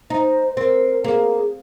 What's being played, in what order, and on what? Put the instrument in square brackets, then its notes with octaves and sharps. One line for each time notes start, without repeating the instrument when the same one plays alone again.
[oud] D#4 [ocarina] C5
[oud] C4 [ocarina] A#4
[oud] A#3 [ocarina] G#4